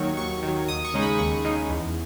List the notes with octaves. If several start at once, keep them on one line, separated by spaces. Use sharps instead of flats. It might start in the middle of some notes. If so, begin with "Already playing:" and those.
Already playing: D#2 D#3 F#3 C#6
D#2 C#6
D#3 F#3
D#2 D#6
C#6
C#3 G#3 D#4
B5
D#2 C#6
C#3 G#3 D#4
E2